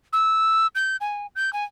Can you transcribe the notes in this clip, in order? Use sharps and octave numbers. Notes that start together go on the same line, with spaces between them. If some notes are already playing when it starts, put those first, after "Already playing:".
E6
G6
G#5
G6
G#5